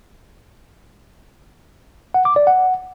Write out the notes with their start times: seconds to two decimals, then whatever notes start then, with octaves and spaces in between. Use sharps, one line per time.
2.14 F#5
2.25 D6
2.36 D5
2.47 F#5